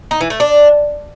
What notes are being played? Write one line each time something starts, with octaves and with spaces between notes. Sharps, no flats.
D#4
E3
A3
D4